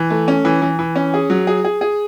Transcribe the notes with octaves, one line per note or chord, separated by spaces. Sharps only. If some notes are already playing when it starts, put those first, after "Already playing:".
Already playing: E3
A3
C#4
E3
E3
E3
C#4
G#4
F#3
G#4
G#4
G#4